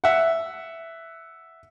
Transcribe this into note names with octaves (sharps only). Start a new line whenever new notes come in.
E5 F#5